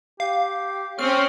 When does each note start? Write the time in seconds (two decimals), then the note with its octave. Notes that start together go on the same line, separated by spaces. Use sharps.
0.20 G4 F5
0.99 C4 C#4 C#5 F6